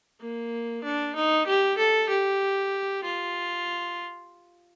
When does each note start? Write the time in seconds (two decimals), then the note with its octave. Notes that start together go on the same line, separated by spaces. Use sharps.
0.21 A#3
0.84 D4
1.15 D#4
1.47 G4
1.78 A4
2.09 G4
3.04 F4